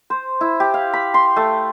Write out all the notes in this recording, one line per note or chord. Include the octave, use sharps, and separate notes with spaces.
C5
E4
G4
F5
B5
C6
A3